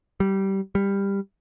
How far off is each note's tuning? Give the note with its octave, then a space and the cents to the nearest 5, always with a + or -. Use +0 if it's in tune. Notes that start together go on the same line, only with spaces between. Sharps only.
G3 -20
G3 +15